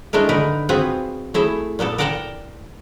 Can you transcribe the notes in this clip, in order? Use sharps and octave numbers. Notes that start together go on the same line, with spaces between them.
G#3 A3 D4 E4 A#4
D3 D#4 A#4 B4
B3 C4 F4 F#4 G#4 B4
A3 E4 G#4 E5
A#2 A#3 B3 A4
A#4 D5 F#5 G5 A5 A#5